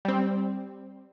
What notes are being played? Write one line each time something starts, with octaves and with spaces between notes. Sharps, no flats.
G3 C4